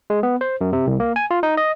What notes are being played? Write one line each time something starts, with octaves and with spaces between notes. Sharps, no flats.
G#3
B3
C5
F#2
C3
C2
A#3
G#5
F4
D#4
D#5